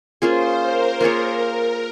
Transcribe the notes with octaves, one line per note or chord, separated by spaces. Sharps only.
A#3 C#4 F4 G#4 C5
A#4
A#3 F4 G#4 A#4 C#5